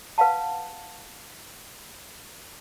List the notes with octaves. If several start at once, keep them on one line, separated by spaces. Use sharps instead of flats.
B4 F5 F#5 A5